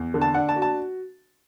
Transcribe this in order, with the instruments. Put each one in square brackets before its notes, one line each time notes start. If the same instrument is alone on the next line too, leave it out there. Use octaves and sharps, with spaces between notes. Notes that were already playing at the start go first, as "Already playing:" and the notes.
Already playing: [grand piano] E2
D3
[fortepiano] A5
[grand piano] D4 [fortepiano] F#5
[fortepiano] A5
[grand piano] F#4
[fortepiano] A5